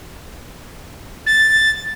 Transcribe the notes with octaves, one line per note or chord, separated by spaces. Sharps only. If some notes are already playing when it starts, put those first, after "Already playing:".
A6